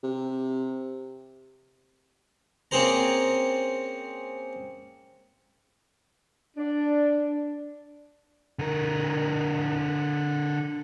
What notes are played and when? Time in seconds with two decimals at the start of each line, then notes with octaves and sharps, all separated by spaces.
0.03 C3
2.71 A#3 C4 C#4 G#4 C5 A#5
6.57 D4
8.59 D3 A#4